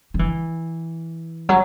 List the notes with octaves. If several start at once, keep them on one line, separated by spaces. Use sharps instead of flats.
F#3
E3
F#3